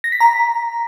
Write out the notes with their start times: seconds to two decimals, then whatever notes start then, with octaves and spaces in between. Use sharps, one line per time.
0.04 A#6
0.12 B6
0.20 A#5